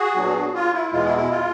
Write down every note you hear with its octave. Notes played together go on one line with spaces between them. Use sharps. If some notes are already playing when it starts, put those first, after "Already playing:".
Already playing: F#4 G#4
A#2 F#3 B3 D4
F4
E4
E2 B2 G#3 F4
E4
E4
F4